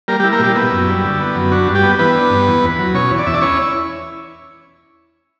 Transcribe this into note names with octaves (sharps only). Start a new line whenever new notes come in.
G3 A#3 A#4
G3 G4
E4
A#3 A#4
A#2 G3 G4
B3 E4
F#2
G3
D3
B3
F#2
D4 F#4
G2
G3 G4
B3
E3 B3 B4
D4
G2
E2
E2
F#3
B2 C#4 C#5
E2
D5
E2 E5
D4 D5
C#4 E4 C#5